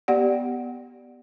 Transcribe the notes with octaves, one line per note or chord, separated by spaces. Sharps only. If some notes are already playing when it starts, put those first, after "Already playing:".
B3 G4 D5 F#5